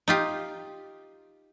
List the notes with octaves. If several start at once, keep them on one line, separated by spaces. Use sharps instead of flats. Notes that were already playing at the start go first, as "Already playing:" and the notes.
D#4 F4 G4